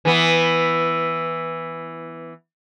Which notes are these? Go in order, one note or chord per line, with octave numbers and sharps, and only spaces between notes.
E3 B3